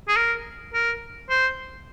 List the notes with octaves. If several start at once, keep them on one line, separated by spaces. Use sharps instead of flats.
G#4
A#4
A#4
C5